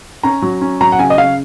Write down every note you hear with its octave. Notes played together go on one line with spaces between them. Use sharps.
C#4 A#5
F#3
C#4
F#3 A#5
F#5
C#3 G#5
D#5
C#3 F5